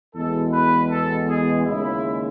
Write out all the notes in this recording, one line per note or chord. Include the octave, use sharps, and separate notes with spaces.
E2 B2 G#3 A4
B4
A4
G#4
D#2 C#3 G#3 E4